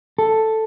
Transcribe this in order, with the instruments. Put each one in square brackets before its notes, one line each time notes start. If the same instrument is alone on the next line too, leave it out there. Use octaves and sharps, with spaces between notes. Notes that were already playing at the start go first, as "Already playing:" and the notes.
[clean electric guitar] A4